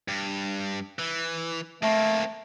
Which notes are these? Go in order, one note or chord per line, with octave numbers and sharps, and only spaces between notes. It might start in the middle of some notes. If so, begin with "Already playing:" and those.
G2
E3
A3 A#3 C4